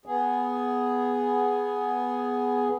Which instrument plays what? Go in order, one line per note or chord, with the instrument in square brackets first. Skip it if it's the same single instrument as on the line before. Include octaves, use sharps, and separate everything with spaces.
[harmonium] B3 G#4